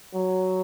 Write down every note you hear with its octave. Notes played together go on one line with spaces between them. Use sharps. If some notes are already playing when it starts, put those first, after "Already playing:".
F#3